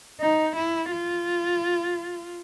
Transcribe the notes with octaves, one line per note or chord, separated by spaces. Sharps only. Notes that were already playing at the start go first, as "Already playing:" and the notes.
D#4
E4
F4